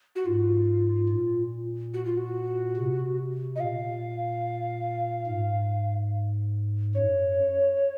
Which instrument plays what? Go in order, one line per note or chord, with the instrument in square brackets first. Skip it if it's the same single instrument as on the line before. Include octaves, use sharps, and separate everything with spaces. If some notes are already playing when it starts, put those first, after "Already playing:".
[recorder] F#4
[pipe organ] G#2 [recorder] F4
[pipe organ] A#2
[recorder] F#4
F4
F#4
[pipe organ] C3
[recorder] D#5
[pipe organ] A#2 [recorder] F5
[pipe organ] G#2
[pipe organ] F#2 [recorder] C#5